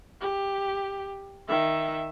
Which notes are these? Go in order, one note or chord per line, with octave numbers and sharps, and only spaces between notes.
G4
D#3 E5